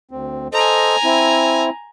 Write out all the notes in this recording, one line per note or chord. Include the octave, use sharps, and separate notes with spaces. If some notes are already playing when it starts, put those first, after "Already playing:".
D2 C4
A4 C5 D#5 G#5 A#5
C4 E4